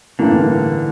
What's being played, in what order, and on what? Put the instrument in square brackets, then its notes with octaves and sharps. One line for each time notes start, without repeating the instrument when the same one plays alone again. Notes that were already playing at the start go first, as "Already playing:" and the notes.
[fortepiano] A1 G2 E3 A#3 [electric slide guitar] D3